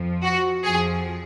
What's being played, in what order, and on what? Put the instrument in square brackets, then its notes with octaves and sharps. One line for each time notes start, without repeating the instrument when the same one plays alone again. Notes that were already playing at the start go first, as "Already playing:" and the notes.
Already playing: [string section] F2 F3
F#4
F2 F3 G#4